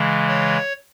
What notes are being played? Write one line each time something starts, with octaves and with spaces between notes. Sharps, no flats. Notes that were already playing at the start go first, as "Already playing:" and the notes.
Already playing: C#3 E3 G#3
C#5